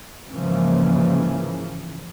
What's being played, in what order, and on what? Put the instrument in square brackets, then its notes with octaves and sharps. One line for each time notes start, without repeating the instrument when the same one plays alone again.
[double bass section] G#2 C#3 E3 F3 A#3